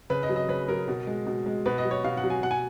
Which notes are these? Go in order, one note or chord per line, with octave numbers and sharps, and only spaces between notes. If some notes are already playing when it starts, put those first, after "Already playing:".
C#3 B4
D#5
F#3
D#5
C#3 B4
F#3 A#4
B2
G#3
B2
G#3
B2 B4
D#5
F#3
C#5
B2 F5
F#5
F#3
G#5
B2 F#5
G#5